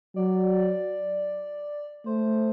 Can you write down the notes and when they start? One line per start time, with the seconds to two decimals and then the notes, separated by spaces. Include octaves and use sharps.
0.16 F#3 D5
2.06 A3 C5